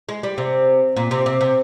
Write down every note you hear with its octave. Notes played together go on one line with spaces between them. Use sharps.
G#3
G3
C3
A#2
C3
C3
C3